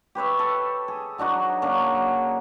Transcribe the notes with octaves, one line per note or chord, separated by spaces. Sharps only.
G4 B4 C#5 E5
A4
G#4
F#3 D4 D#4 F#4
C#3 A#3 D4 A#4